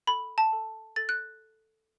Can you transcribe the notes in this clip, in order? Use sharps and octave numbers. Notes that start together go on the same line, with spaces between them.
A4 B5
A5
A4
A4 A6
F#6